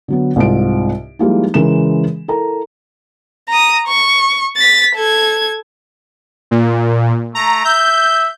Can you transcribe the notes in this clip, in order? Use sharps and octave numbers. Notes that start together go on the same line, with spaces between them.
D3 F#3 B3
C2 G#2 F4 D7
F3 G3 G#3 A#3 D#4 E4
C#3 E3 G#3 A#4 E7
E4 A4 A#4 A#5
A#5 D#6
C#6
A6 B6
A4 G#6
A#2
A3 A#5
E5 G6